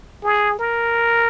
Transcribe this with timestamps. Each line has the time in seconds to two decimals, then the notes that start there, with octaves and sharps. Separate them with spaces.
0.23 G#4
0.59 A#4